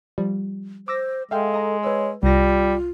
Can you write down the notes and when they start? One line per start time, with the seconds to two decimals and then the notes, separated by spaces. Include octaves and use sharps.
0.18 F3 G3
0.88 C5 D6 E6 A#6
1.31 G#3 A4 E5 F5 G5
1.54 D#5 A#5
1.83 B4 C#5 E6
2.23 C2 G3 F4 A#6